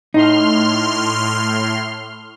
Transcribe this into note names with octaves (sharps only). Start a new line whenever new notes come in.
A2 D#4 C6 F6